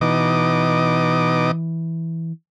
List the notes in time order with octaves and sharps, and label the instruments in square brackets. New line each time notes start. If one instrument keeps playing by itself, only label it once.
[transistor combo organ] B2 D#4 D6 [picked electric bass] E3